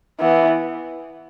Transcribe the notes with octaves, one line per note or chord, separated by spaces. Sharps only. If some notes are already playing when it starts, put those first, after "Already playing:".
E3 B3